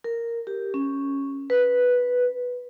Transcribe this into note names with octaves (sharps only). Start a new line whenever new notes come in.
A#4
G4
C#4
B4